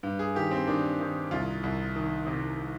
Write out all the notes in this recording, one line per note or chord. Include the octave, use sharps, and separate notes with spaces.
G2
G#4
D#3 G4
C4
D#3 D4
D#3
C2 F4
C2
D#3
C3